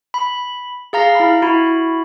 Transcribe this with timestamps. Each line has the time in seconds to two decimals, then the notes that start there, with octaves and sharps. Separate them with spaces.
0.14 B5
0.93 G#4 F5 A#5 A#6
1.15 E4 B5
1.42 E4 F#4 B5